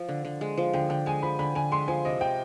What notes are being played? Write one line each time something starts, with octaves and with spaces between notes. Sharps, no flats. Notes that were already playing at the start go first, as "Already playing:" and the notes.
Already playing: F3
D3
D3
G#3
F3
D3 G5
D3 G5
G#3 G#5
F3 B5
D3 B5
D3 G#5
G#3 C6
F3 G#5
C3 D#5
C4 G5